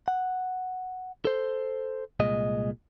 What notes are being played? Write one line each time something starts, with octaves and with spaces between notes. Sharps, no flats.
F#5
A4 C5
C2 A#2 G#3 D#5